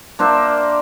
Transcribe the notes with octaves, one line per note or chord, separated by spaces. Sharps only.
A#3 D4 C5 E5